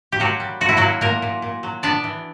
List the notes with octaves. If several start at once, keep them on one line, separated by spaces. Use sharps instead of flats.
G4
A#2 F#3 F#4
G3
A#2 F#4
E4
F#3 A#3 F#4
A#2 A#3 A#4
A#2
A#2
F#3
B3 D4 D5
E3